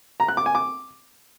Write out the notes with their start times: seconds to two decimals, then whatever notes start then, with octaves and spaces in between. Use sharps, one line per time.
0.20 A#5
0.28 F#6
0.37 D6
0.46 G#5
0.55 D6